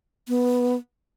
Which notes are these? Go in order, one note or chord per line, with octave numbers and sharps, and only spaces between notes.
B3